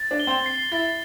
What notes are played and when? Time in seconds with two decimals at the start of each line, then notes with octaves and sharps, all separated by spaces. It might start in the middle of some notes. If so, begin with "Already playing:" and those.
Already playing: A6
0.11 D4
0.20 G7
0.27 C4
0.46 C7
0.72 E4 A6